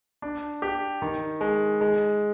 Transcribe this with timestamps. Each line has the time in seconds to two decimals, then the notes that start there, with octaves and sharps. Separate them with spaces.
0.22 D4
0.62 G4
1.02 D#3
1.41 G#3
1.81 G#3